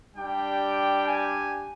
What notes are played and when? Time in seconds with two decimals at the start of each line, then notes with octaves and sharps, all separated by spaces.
0.15 G3 D4 G4 G5
1.07 G#5